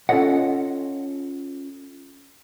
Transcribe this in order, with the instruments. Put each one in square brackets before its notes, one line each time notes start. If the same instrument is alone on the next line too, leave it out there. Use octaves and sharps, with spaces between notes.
[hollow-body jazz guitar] C#4 F4 A4 C#5 D#5 F#5